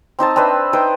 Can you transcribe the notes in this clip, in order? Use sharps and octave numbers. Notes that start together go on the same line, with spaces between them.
C4 D#4 C5 A5
C4 D4 B4 E5
D#4 B4 C5 G5